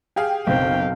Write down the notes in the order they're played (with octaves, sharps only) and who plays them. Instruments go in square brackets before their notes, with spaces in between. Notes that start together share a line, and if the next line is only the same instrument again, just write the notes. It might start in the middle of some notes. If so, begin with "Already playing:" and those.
[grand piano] G4 G#4 F5 [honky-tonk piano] G5
[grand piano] F#1 [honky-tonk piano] B1 C4 [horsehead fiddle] F5 G5